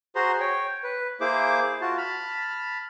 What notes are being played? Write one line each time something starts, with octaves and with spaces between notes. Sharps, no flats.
F#4 G#4 C5 A#5 C6
C#5 G5
B4
A#3 E4 G#4 C5 D6
F4 F#4 A5
A5 B5 F6